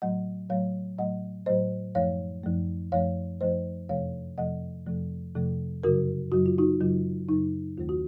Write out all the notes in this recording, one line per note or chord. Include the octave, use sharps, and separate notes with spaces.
A2 F#3 A3 D#5 F#5
A2 F#3 A3 C#5 F5
A2 F#3 A3 D#5 F#5
A2 F#3 A3 C5 D#5
F#2 F3 A3 C#5 F5
F#2 F3 A3
F#2 F3 A3 C#5 F5
F#2 F3 A3 C5 D#5
F2 C3 F3 A3 C#5 F5
F2 C3 F3 A3 D#5 F#5
F2 C3 F3 A3
F2 C3 F3 A3
F#2 C#3 F#3 F#4 A#4
F#2 C#3 F#3 F#4
F4
D#4 F#4
F#2 C#3 F#3 F4
F#2 C#3 F#3 D#4
D#2 D#3 A3 F4
F#4